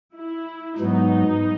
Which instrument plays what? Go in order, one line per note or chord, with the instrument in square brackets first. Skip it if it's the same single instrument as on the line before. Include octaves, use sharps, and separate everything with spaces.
[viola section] E4
[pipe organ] G#2 F#3 B3 [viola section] D#4